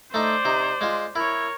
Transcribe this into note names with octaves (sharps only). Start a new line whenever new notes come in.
A3 D#4 C5 D5
C3 D#4
G#3 F4
E4 A#4 C#5